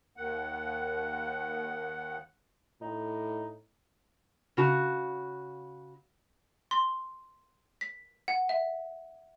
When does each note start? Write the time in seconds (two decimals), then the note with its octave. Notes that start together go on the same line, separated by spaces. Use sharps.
0.17 D#2 D#3 F#5
2.82 A2 D#4
4.57 C#3 F#4 A5
6.71 C6
7.81 B6
8.28 F#5
8.49 E5